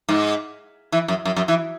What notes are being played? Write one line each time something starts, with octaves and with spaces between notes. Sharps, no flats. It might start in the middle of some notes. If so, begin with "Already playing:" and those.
G#2
E3
F#2
F#2
F#2
E3